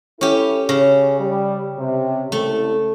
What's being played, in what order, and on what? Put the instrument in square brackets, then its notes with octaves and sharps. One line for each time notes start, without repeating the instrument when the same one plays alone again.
[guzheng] C#4 G4 [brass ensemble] E4 A4
[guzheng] C#3 [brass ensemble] G#4 C#5
[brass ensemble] G3
C3
[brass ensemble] C2 A4 [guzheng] A3